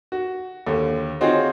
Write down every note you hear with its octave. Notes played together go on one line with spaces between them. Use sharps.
F#4
D#2 D3
C4 D#4 F4 F#4 G#4 C#5